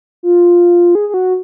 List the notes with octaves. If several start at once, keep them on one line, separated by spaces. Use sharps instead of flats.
F4
G#4
G#4
F#4